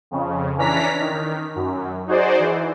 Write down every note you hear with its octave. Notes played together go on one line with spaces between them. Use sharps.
F2 C#3
E3 C#4 D4 A#5 B6
D#3
F#2
D#4 F#4 G#4 C5 D5
E3